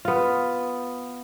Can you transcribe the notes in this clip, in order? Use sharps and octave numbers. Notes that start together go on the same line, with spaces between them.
B3 F4